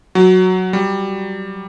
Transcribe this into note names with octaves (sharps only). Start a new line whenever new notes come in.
F#3
G3